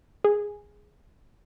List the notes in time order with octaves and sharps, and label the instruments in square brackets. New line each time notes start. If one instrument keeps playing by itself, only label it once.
[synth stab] G#4